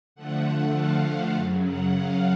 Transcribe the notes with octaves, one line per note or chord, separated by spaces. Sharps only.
D3 F3 A3 F#5
F5
F#2 C#3 F#3
F#5
F5